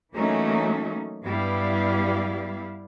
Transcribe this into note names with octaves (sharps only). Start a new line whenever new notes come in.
E3 F#3 A3 A#3 C#4 D#4
G2 G3 B3 E4 F5